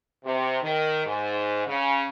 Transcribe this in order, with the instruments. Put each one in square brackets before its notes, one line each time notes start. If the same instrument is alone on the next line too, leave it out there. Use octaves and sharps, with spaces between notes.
[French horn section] C3
D#3
G#2
C#3